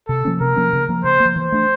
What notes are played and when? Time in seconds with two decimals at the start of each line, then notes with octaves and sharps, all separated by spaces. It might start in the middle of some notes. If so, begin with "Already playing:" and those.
0.08 C3 A4
0.25 F3 A#3 C#4
0.40 C3 A#4
0.56 F3 A#3 C#4
0.73 C#3
0.89 F3 A#3
1.04 C#3 C5
1.20 A#3
1.25 F3
1.36 E3 C5
1.52 A3 D4